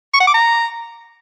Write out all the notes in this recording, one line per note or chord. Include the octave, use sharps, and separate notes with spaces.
C#6
F#5
D6
A#5